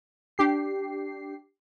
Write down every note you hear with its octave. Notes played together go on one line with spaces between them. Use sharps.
D4 G4 C7